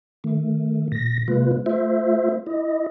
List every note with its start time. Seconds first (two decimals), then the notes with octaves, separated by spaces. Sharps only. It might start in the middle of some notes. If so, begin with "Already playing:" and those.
0.24 D#3 A3
0.92 A#2 A#6
1.28 C3 G#3 A#3 F4 B4
1.66 A3 F4 C5 E5
2.46 E4 D#5